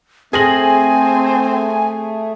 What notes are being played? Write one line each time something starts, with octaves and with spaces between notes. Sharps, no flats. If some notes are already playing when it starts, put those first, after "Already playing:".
A3 C4 G#4 G#5 A#6 F#7